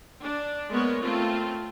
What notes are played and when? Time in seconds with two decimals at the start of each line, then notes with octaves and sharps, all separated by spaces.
0.23 D4
0.72 G#3 A#3 B3 A#4 C#5
1.03 A3 C4 F4